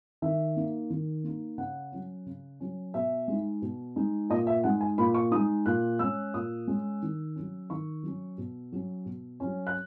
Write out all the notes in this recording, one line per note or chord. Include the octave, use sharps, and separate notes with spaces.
D#3 E5
A#3 D#4
D#3
A#3
D#4
C#3 F#5
F#3 C#4
C#3
F#3 C#4
B2 E5
G#3 D#4
B2
G#3 D#4
A#2 D#5
E5
G#3 D#4 F#5
G#5
A#2 B5
C#6
G#3 D#4 D#6
A#2 F#6
G#3 C#4 E6
A#2 D#6
G#3 C#4
D#3
F#3 C#4
D#3 C#6
F#3 C#4
B2
F#3 C#4
B2
F#3 C#4
F#6